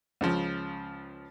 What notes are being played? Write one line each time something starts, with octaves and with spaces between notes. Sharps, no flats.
C#2 C#3 F3